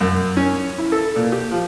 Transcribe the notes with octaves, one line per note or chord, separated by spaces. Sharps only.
F#2
C#4
E4
A4
A#2
G4
F3